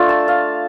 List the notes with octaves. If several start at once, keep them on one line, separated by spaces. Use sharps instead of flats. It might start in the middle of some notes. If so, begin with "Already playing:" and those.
Already playing: A3 D4 F4
A5
F5